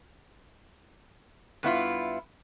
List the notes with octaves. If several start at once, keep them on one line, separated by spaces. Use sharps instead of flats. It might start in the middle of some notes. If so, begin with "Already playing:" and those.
G2 B3 E4 F4